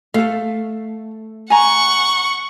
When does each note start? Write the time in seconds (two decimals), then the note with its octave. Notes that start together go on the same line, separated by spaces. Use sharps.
0.14 A3 A4 F5
1.50 F#5 G#5 A#5 C#6